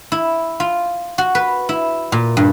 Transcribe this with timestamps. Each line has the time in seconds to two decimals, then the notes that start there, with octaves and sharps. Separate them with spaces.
0.12 E4
0.60 F4
1.18 F#4
1.35 B4
1.69 E4
2.12 A#2
2.37 G2